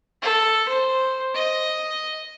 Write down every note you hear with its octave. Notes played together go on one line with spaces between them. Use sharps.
A4
C5
D#5